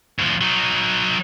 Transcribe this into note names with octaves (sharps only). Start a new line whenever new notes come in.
D2 F3
F#3 D#4